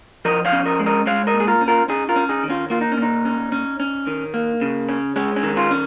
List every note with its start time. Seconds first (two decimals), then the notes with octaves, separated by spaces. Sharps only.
0.25 F3 A#4 D#5
0.45 C#5 F5
0.52 C#4
0.66 A#4 D#5
0.79 G#3
0.86 A#4 D#5
1.06 G#3 C#5 F5
1.27 A#4 D#5
1.34 A#2
1.40 G#4
1.47 F4 A#4
1.61 C#4
1.68 F4 A#4
1.88 C#4 D#4 G#4
2.09 F4 A#4
2.16 C#4
2.29 D#4 G#4
2.43 D#3
2.50 C#4 F4
2.70 A#3 F4
2.81 D#4
2.92 C#4
2.97 A#2 D#4
3.25 C#4
3.52 C#4
3.80 C#4
4.07 D#3
4.34 A#3
4.61 C#3
4.89 C#4
5.16 G#3 C#4
5.36 C#4
5.43 D#3
5.56 C#4 F4
5.71 C#4